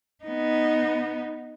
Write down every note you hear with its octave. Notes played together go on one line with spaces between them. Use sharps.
B3 D#4